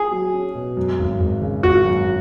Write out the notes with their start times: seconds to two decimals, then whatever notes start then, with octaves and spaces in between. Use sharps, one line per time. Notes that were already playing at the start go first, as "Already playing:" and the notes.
Already playing: G#4
0.11 F#3
0.34 C#4
0.55 B2
0.77 F#2
0.99 G#1
1.20 G#1
1.42 C#3
1.63 G#1 F#4
1.85 F#2